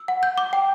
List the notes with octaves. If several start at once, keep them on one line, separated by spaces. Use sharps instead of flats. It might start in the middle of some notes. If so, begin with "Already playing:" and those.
Already playing: E6
F#5
G6
D6
G5